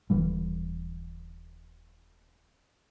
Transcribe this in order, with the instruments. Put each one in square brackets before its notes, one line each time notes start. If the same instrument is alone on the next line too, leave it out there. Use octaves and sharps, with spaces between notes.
[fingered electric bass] D#1 D3 E3 G3